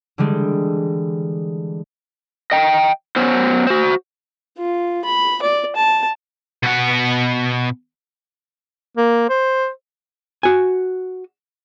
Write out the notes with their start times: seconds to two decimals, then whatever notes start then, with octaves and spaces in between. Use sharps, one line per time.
0.18 D3 E3 G3 G#3
2.52 D#5 G5
3.16 F#3 B3 C#4 C5
3.67 F#4 C5
4.58 F4
5.05 B5
5.42 D5
5.76 A5
6.63 B2 F#5
8.97 A#3
9.29 C5
10.43 F#4 G#5